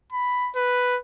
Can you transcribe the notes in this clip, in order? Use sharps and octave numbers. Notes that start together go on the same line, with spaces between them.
B5
B4